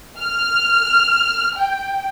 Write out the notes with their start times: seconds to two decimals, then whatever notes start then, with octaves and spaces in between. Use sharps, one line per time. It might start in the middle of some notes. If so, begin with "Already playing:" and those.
0.18 F6
1.55 G5